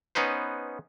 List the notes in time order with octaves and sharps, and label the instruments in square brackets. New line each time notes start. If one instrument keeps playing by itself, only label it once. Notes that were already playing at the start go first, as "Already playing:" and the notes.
[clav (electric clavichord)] B3 C#4 D#4 B4 C5